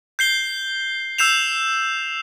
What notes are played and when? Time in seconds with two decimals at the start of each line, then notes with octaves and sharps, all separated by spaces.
0.19 G6 C7 G7
1.18 E6 G6 C7 E7 F7